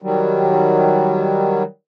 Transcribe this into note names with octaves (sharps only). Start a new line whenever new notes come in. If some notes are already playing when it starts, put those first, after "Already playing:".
D#3 F#3 G3